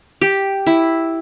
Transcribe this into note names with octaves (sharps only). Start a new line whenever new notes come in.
G4
E4